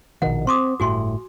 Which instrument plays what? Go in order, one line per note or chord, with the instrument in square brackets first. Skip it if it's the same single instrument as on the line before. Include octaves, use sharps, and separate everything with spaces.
[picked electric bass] A#1 B2 D#3 [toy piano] F#5
[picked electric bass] C4 [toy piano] C6 D6 D#6
[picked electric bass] G1 A2 [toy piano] F#4 G#5 C6